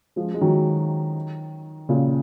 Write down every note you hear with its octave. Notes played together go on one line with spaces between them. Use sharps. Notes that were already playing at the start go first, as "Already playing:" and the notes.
F3 G#3
G#3
D#3 F#3
A#2 C#3